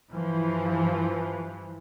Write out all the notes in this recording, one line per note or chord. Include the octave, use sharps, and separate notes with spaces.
G2 E3 F3